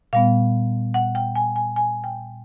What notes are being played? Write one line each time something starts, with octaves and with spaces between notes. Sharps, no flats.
A#2 G3 B3 F5
F#5
G5
G#5
G#5
G#5
G5